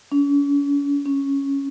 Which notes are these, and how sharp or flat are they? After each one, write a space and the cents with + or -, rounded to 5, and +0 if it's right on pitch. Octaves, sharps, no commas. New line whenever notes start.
C#4 +40
C#4 +0